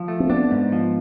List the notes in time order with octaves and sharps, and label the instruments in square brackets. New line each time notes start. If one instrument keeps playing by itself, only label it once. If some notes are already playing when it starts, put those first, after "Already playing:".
Already playing: [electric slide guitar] F3
A3
[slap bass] C4
[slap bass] B3 [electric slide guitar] D4
[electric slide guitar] G#2
F3